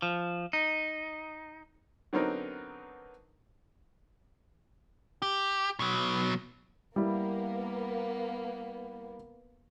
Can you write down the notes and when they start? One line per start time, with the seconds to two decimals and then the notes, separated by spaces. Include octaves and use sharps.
0.02 F3
0.53 D#4
2.13 D3 F#3 B3 C4 D#4 A#4
5.22 G4
5.80 B2 F#3
6.96 G3 A#3 B3 E4